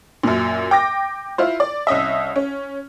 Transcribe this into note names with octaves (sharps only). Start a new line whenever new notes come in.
F#2 A#2
G5 D6 A#6
E4 F4 C5
D5
C2 C#4 D#5 E5
C#4